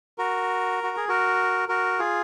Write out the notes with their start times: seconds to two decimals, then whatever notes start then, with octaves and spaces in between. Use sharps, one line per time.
0.18 F#4 A#4
0.83 F#4
0.97 G#4
1.08 F#4 A#4
1.69 F#4 A#4
1.99 F4 G#4